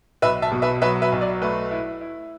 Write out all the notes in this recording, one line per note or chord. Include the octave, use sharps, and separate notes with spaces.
B1 B4 E5
E5 A5
B2
B4 E5
F#3 B4 E5
B4 E5
B1
D5
A3 B4
E4
E4